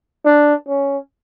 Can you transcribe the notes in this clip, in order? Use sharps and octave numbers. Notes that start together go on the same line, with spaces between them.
D4
C#4